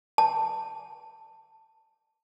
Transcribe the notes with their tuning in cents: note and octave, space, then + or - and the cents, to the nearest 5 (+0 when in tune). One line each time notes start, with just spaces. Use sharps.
A5 +15